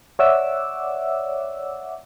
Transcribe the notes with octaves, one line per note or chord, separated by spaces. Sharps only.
C#5 D5 E5 F#5 D6 E6